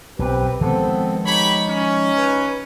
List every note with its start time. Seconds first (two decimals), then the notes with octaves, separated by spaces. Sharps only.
0.19 B1 C4 G4 B4
0.61 D#3 F3 G#3 B3 C4 A4
1.24 D#4 G4 C#5 B5
1.67 C#4
2.17 B4